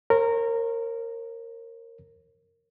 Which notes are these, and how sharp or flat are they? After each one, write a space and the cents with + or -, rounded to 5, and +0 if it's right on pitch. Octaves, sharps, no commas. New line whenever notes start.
A#4 -15 C#5 -45